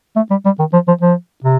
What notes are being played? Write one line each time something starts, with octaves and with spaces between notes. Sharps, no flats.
A3
G3
G3
D#3
F3
F3
F3
C3